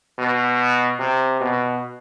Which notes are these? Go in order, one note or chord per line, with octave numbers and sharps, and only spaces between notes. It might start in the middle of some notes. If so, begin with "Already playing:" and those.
B2
C3
B2